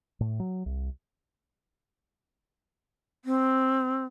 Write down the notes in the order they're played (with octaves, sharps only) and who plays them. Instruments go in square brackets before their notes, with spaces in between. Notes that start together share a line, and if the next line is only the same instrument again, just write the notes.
[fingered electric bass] A2
F#3
C2
[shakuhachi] C4